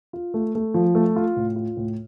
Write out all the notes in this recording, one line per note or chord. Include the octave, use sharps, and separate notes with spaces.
F4
A3
A3
F3
A3
F4
A2
F4
A2